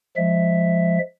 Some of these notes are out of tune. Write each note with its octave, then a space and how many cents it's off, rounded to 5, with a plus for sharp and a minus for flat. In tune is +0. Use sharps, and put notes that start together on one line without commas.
F3 +0 G#3 +0 E5 +0